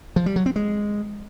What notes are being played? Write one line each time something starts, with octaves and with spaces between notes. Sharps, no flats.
F3
G3
F#3
C4
G#3